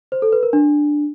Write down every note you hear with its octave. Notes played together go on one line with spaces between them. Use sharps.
C5
A4
B4
A#4
D4